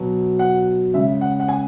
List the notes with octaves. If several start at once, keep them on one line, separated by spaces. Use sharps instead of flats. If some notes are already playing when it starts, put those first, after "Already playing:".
Already playing: B2 F#3
F#5
C#3 G#3 E5
F#5
F#5
G#5